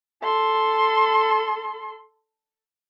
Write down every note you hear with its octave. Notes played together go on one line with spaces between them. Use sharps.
A4 C6